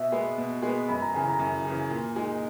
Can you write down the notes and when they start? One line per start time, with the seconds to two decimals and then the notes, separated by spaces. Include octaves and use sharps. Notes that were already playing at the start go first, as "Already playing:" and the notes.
Already playing: B2 E5
0.12 G#3 B3
0.38 B2
0.62 G#3 B3
0.88 F#2 B5
1.02 A#5
1.14 C#3 E3 G#5
1.28 A#5
1.39 F#2
1.65 C#3 E3
1.90 A#2
2.16 G#3 D#4